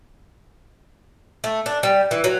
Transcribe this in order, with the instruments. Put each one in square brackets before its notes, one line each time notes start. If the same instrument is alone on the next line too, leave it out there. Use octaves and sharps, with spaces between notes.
[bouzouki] A3
D4
G3
E3
F#3